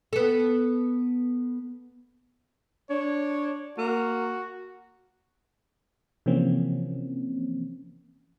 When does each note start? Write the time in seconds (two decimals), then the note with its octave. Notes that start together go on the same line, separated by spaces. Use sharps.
0.13 B3 A4
2.90 D4 C#5
3.78 A#3 F#4
6.26 C3 E3 F3 A#3 C4 C#4